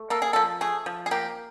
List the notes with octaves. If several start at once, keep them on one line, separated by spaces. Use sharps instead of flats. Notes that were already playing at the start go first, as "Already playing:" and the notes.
Already playing: A3
A#3 A4
G#4
F3 A4
A3 G#4
F3
G#4
A#3 G4